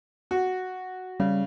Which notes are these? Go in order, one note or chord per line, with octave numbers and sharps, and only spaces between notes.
F#4
C#3 G3